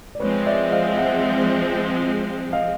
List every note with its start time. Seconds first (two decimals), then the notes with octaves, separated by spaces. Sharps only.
0.15 D5
0.20 F3 G#3 C4 B4 C#5
0.46 D5 E5
0.71 D#5 F5
0.97 E5 F#5
2.53 D#5 F5